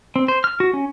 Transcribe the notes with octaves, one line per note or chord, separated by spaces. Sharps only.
C4
C5
F6
F#4
C#4